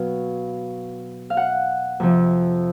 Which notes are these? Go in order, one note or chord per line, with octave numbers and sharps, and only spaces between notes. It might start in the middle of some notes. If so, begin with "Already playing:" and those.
Already playing: B2 F#3 B3 F5
F5
F#5
F2 C3 F3